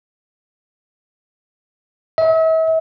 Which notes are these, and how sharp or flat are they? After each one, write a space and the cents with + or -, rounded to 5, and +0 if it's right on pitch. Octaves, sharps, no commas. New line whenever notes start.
E5 -40